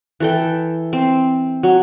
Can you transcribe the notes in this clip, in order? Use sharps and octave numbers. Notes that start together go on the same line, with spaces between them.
E3 A4 G5
C4
F#3